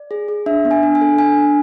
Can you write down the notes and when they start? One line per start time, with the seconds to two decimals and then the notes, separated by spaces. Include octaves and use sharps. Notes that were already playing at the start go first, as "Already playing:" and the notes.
Already playing: D5
0.11 G#4
0.28 G#4
0.46 D4 E5
0.65 B3
0.71 G#5
0.83 D4
0.95 G#5
1.01 A4
1.19 D4 G#5
1.38 D4